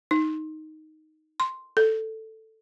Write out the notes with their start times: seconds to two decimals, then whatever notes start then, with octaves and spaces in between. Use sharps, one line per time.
0.11 D#4
1.40 C6
1.77 A4